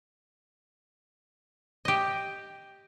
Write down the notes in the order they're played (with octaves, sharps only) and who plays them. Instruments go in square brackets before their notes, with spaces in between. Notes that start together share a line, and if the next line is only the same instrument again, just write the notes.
[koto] G4 D#5